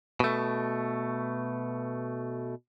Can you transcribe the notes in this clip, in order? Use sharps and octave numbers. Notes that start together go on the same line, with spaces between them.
B2 A3